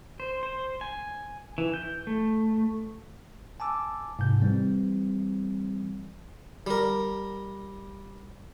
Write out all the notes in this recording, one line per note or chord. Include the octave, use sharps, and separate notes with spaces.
C5
C5
G#5
E3
G6
A3
G#5 A5 D6 E6
G#2 C3 G6
E3 G3 C4
G3 A#4